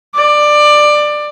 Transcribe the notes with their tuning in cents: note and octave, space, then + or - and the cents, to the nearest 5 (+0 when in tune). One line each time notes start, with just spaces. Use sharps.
D5 +15